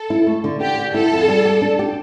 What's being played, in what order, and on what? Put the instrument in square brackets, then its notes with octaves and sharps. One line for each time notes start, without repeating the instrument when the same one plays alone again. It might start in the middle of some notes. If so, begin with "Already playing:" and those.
Already playing: [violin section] A4
[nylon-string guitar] E4
A3
D3
[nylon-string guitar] D3 [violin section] G4
[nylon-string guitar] D3
[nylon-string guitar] E4 [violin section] A4
[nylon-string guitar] F2
G3
G4
D4
G4